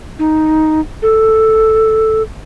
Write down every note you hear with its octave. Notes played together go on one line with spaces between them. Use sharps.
D#4
A4